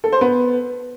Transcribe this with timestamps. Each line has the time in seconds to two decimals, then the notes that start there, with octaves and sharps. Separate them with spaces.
0.04 A4
0.12 C5
0.21 B3